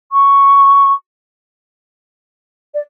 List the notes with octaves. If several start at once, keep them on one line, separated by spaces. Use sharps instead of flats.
C#6
D5